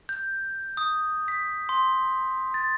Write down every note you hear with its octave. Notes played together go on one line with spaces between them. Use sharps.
G6
D#6
B6
C6
A6